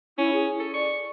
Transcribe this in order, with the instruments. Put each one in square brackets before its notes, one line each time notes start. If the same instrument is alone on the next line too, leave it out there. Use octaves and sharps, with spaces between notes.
[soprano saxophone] C#4 [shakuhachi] E4
[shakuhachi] G#4
[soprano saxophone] A4
[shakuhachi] D5 [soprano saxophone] C#6